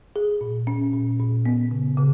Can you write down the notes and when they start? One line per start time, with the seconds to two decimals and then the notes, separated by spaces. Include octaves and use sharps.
0.16 G#4
0.41 A#2
0.67 C#4
0.93 A#2
1.19 A#2
1.46 B3
1.71 C#3
1.98 C#3